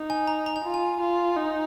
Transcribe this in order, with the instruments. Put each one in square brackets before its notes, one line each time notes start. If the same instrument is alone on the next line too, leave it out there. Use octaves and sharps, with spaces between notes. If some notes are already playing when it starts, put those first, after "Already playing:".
Already playing: [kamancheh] D#4
[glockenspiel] G#5
A#5
A#5
G#5
[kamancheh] F4
[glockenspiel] G#5
[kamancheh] F4
D#4